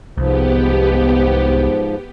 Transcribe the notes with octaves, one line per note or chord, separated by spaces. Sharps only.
C2 G#2 F3 B3 G4